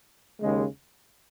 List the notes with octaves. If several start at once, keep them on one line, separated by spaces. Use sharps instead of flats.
D#2 C#3 G#3